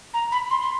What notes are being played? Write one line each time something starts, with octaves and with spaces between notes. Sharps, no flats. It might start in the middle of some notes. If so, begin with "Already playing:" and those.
A#5
B5
C6
C6